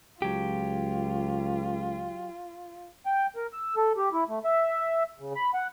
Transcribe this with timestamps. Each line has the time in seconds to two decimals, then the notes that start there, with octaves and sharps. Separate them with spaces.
0.22 C#2 F#3 F4 G4
3.06 G5
3.36 A#4
3.53 E6
3.76 A4
3.97 G4
4.13 E4
4.28 A3
4.44 E5
5.20 C#3
5.35 B5
5.54 F#5